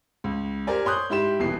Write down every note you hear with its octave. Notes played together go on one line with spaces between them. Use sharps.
C#2
G4 A#4 C5 D5 G#5
C#5 C6 D#6 F#6 G6
G#2 E4 G4 C6 E7
D#1 B2 E3 C7